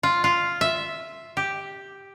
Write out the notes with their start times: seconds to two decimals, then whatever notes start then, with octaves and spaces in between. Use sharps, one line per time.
0.03 F4
0.24 F4
0.61 E5
1.37 G4